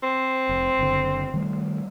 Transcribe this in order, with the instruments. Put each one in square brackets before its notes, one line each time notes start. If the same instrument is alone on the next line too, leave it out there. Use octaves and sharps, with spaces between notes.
[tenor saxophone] C4
[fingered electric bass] F1
F#1 D3
D#3 G3 A3